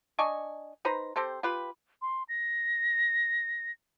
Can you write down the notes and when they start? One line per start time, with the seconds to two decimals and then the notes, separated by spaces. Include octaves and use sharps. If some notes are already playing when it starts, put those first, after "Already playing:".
0.19 D4 D#5 G#5 C#6
0.85 D#4 B4 C5 A#5
1.16 C4 G4 A4 C5
1.43 F4 G4 B4
2.02 C6
2.29 A#6